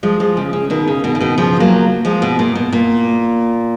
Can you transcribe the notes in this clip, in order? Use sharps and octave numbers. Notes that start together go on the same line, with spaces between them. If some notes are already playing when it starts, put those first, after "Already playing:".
F3 G#3
F3 G#3
C#3
C#3
B2 D#3
C#3
B2 D#3
C#3
B2 D#3
C#3 F3
F#3 A#3
F3 G#3
B2
A#2
B2
A#2